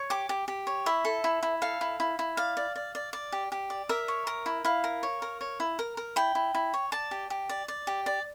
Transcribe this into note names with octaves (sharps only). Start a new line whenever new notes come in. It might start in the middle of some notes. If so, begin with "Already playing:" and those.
Already playing: C#5
G4 D6
G4
G4
C#5
E4 E5
A4
E4
E4
A4 F5
E4
E4
E4
D5 F5
D5
D5
D5
D5
G4
G4
D5
A#4 E5
C#5
A#4
E4
E4 F5
A#4
C#5
A#4
C#5
E4
A#4
A#4
E4 G5
E4
E4
C#5
D5 A5
G4
G4
D5
D5
G4
D5